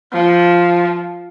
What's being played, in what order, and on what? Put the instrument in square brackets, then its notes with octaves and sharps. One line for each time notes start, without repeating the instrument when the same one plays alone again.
[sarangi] F3